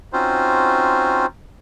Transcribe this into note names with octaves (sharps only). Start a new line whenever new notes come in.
C4 C#4 D#4 F4 F#4 C5